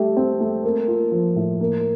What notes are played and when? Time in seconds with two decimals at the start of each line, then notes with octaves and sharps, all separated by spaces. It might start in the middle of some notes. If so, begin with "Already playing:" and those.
Already playing: G3 A3 G4
0.17 C4
0.40 A3
0.64 A#3
0.88 F4
1.11 F3
1.36 A2
1.60 A#3